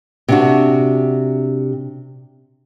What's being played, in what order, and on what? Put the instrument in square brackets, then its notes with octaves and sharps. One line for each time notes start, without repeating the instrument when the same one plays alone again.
[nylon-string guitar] C3 D4 F#4